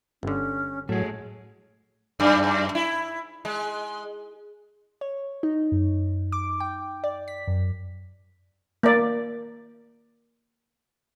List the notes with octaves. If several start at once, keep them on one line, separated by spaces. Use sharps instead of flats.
G1 D3 C#4
A2 F#3 A3 G#4 C#5
F#2
E4
G#3
C#5
D#4
F#2
D6
G5
D5
B6
F#2
A#3 D5